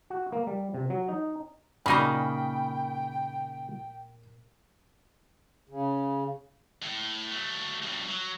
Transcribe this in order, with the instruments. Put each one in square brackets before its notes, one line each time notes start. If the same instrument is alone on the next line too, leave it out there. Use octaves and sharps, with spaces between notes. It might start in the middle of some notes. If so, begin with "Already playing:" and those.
[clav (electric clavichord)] F#4
A#3
G3
C3
F#3
D#4
[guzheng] A#2 G#5 A#5 [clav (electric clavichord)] C#3 A#3 D#4 [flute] G5 [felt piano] B5
[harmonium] C#3
[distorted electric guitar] A2
F#3 A3
G2 B2
F#3